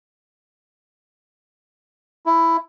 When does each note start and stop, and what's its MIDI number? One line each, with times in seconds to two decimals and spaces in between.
2.26 2.57 64